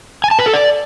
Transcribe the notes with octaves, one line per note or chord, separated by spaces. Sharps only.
G#5
A5
B4
A4
D5